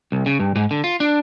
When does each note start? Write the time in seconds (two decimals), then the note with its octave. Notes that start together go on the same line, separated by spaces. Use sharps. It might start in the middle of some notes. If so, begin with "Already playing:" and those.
0.12 C2
0.26 C#3
0.40 G2
0.56 G#2
0.71 D3
0.84 F4
1.00 D4